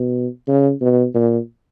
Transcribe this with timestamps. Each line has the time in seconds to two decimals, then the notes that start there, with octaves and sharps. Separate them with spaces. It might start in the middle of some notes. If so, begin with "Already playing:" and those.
Already playing: B2
0.47 C#3
0.81 B2
1.15 A#2